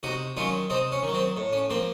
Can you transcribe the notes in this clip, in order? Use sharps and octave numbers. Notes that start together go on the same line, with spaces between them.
C3 D#4 F#4
D#3 F#3 C#4 F4
C3 C4 D#4
C#4
D#3
F#3
C4
A2
C#4
F3 A#3 C4